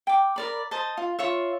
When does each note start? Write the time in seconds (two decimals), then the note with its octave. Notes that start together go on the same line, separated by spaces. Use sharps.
0.07 G5 D6
0.36 A#4 D5 B5
0.71 C5 D#5 A5
0.97 F4
1.19 F4 C#5 E5